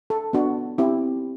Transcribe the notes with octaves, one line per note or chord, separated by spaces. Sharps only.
A4
B3 D4 F#4
C4 E4 G4